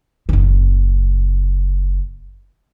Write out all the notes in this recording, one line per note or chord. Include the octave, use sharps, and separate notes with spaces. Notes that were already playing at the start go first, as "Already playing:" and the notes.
F#1 C#3